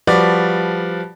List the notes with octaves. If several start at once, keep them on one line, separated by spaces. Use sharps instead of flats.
F3 G3 F#4 B4 D5